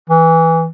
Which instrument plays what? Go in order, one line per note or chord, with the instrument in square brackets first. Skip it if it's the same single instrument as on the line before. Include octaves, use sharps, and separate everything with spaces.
[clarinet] E3